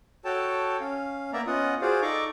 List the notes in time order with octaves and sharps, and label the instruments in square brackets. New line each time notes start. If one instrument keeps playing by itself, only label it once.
[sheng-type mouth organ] F#4 A4 C#5 G5 A5
C#4 F5
A#3 B3 D5 E5 A#5
B3 C#4 F4 D#5 F#5 D#6
F4 F#4 G#4 C5 D5 F5
D#4 A4 D5 A#5 C#6 D6